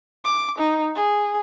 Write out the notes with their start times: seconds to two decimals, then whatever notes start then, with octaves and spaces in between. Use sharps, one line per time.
0.25 D6
0.58 D#4
0.95 G#4